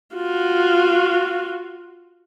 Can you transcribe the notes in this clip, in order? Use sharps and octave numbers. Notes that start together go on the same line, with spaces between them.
F4 F#4